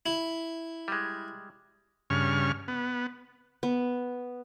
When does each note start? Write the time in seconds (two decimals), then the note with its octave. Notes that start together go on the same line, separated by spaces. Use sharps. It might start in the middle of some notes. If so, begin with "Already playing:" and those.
0.06 E4
0.88 G3 G#3
2.10 G2 C#3 C#6 F6
2.68 B3
3.63 B3